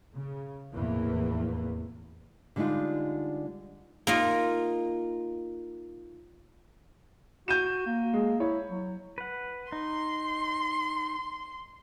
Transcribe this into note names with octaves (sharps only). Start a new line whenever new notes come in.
C#3
F1 E2 A2 E3 A#3
D3 G3 G#3 D#4 F4
A#3 D#4 F4
F#4 G6 D#7 E7
A#3
G#3
E4 C#5
F#3
B4 F#5
D#4 C6